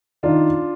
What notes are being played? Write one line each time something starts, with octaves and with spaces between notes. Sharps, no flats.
D#3 D4 F4